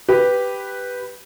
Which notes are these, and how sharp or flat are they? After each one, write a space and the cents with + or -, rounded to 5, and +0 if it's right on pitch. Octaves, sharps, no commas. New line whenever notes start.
G4 +0 B4 +0